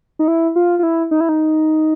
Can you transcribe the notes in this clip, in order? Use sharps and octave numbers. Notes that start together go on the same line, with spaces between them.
D#4
E4
F4
F4
E4
D#4
E4
D#4